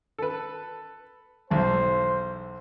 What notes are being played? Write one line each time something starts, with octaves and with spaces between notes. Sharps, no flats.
A4 B4
B1 E2 C5